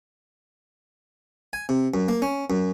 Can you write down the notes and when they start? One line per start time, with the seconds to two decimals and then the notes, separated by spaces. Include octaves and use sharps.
1.53 G#5
1.69 C3
1.94 F#2
2.08 A#3
2.22 C#4
2.50 F#2